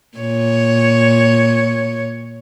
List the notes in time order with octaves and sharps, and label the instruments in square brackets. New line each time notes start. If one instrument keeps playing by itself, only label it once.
[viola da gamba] A#2 C#5